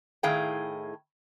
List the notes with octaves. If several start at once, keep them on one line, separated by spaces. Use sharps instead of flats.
A2 D#3 E4 G#4 F5 G5